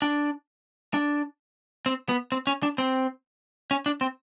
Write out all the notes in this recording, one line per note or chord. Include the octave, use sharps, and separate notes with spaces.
D4
D4
C4
B3
C4
C#4
D4
C4
C#4
D4
C4